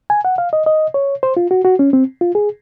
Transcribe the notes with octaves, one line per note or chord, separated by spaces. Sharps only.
G#5
F#5
F5
D#5
D#5
C#5
C5
F4
F#4
F#4
C#4
C4
F4
G#4